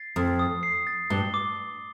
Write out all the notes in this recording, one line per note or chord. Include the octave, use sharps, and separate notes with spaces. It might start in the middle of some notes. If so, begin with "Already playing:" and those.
Already playing: A6 C7
F2 D#6
D#6
C7
A6
G2 G7
D6